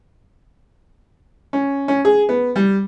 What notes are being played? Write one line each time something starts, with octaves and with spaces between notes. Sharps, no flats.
C#4
C#4
G#4
B3
G3